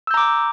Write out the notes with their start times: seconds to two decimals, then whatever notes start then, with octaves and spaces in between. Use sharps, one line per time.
0.07 E6
0.11 G6
0.14 A#5
0.17 D6